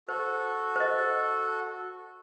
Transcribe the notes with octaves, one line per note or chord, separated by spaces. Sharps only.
F#4 A4 C5
C5 D#5